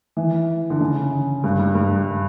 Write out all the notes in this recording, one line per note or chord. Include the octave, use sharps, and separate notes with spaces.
E3
D3
C#3
G2
G2
G2